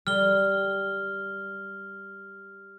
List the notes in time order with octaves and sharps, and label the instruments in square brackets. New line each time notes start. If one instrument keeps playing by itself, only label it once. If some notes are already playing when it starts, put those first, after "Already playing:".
[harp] G3 [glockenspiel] F6 G7